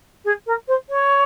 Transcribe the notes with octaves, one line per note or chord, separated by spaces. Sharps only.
G#4
A#4
C5
C#5